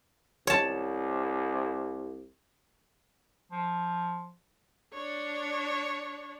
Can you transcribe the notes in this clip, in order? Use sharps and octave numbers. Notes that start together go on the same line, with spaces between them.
C2 C#5 A5
F3
D4 C#5